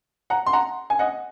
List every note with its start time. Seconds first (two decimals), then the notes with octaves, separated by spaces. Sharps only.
0.30 F#5 A#5
0.46 C6
0.53 F#5 A#5
0.90 G#5
0.99 D#5 F#5